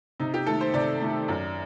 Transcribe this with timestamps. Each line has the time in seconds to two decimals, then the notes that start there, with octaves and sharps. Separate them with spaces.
0.20 C3 D#4
0.34 G4
0.46 D#3 A3 A4
0.61 C5
0.74 C3 D5
1.01 D#3 A3
1.28 F#2